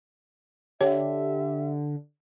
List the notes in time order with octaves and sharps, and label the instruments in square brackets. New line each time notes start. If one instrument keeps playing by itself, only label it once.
[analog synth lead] D3 [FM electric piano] G4 [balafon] C#5 [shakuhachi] E5